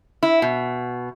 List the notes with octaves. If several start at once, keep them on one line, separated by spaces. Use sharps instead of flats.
E4
B2